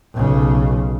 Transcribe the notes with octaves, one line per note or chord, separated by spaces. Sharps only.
B1 C#3